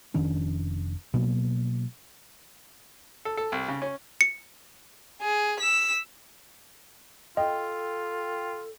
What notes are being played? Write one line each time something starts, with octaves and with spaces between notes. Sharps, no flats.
F1 D#3 C#4 D4
B2 F#3 A#3
A4
A4
C2
C#3
C#4
C#7
G#4
E6 B6
F4 A4 D#5 G5